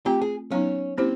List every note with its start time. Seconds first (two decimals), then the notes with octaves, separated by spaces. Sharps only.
0.06 A3 C4 F4 G4
0.22 G#4
0.51 F#3 B3 C#4 D#4
0.98 A#3 C4 C#4 E4 G4 C5